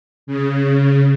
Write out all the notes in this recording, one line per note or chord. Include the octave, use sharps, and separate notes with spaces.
C#3